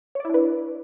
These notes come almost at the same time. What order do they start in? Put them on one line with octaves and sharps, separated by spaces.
C#5 D5 E4 D4 B4